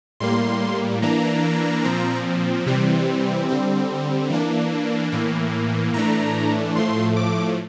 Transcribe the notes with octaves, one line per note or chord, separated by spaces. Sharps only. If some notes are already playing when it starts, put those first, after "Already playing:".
A2 G3 A#3 C6
E3 A#3 D4 A#5
A#2 F3 C4
C3 E3 G3 C4
D3 G3 C4
E3 A#3 D4
A2 E3 A#3
A2 E3 A3 D4 A#5
A2 F3 A3 C6
D6